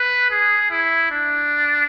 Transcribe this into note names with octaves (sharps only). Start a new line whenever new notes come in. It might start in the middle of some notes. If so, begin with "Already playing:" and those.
Already playing: B4
G#4
E4
D4